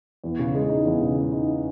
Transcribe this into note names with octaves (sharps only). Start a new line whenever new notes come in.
E2
C#3
G#3
D#4
E2
C#3
G#3
D#4